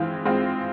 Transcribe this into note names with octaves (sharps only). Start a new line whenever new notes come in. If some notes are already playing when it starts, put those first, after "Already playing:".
Already playing: E3 G#3 C4 F4
G#3 C4 F4